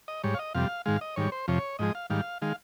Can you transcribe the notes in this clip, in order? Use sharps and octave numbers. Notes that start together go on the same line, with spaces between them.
D#5
G#2 G3 C#5
F5
D#5
F2 C3 G3 F5
G#2 D#3 G#3 F5
D#5
G#2 D#3 G3 C#5
C5
F2 C3 F3 C#5
G#2 F3 G#3 D#5
F5
G#2 D#3 G3 F5
D#3 G#3 F5